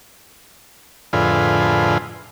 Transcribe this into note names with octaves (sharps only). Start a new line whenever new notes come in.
F2 A2 D3 F4 G#4 B4